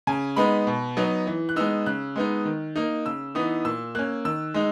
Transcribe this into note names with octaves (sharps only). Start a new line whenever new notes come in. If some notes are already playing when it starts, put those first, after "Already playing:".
C#3 G#5
G#3 B3 D#4 B5
B2
F#3 B3 D#4
E3
F#6
G#3 B3 D#4 E6
C#3 F#6
G#3 B3 D#4
D#3
A#3 D#4
C#3 E6
E3 B3 D#4 D#6
A#2 E6
A#3 C#4 F#6
D#3 E6
G#3 D#4